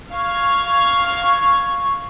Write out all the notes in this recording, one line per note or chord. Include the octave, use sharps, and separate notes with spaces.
F5 C#6 G#6